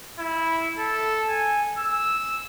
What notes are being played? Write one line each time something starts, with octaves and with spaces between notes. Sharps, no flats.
E4
A4
G#5
E6